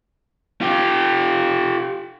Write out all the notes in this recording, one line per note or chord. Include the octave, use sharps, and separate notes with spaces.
F4 G4